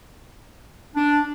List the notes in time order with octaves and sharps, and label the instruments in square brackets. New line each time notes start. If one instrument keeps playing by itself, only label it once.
[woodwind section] D4